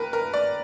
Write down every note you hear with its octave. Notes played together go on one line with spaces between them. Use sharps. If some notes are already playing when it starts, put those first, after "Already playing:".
Already playing: D#2 A#4 B4
A#4
D5